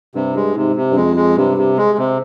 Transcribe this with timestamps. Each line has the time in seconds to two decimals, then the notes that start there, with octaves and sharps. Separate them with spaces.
0.15 G2 C3
0.35 G2 G#3
0.56 G#2 C3
0.76 C3
0.91 G2
0.96 F2 G#3
1.16 G#3
1.37 G2 C3
1.58 C3
1.77 G#3
1.98 C3